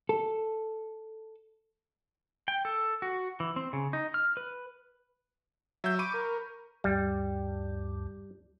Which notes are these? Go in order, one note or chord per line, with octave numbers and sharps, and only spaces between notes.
A4
G5
A4
F#4
E3
C4
C#3
D#4
F6
B4
F#3 E5 G6
B5 C#6 D6 D#7
A#4
D2 G2 G3